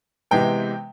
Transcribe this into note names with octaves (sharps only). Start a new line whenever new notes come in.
C3 E3 G#3 B3 G5